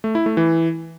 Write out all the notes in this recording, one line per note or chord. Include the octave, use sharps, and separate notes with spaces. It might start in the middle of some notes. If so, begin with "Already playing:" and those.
A3
E4
A3
E3